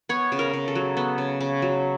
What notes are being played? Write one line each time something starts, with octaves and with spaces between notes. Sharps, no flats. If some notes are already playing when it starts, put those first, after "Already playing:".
B3 C#5
C#3
A#4
C#3
A4
F#3
B3 A4
C#3
C#3
F#3